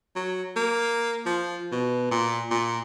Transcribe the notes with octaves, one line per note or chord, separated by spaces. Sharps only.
F#3
A#3
F3
B2
A#2
A#2